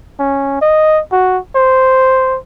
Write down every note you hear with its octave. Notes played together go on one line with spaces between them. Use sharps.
C#4
D#5
F#4
C5